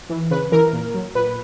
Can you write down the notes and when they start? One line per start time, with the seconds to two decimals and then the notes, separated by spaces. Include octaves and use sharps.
0.10 E3
0.31 C#3 B4
0.52 E3 A#4
0.73 A#2
0.94 F#3
1.15 A#2 B4